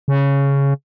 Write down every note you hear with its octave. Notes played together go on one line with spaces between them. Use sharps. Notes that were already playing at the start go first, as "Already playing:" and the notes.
C#3